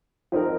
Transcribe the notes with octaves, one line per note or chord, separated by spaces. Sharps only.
F3 C4 D#4 A#4